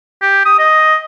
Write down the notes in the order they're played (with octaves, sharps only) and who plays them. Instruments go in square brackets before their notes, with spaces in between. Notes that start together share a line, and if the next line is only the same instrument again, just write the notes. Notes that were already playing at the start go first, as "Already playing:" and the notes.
[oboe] G4
D#6
D#5